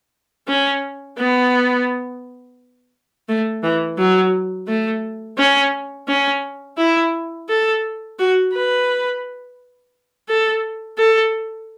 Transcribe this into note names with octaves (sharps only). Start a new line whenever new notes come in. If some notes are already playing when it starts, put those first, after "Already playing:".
C#4
B3
A3
E3
F#3
A3
C#4
C#4
E4
A4
F#4
B4
A4
A4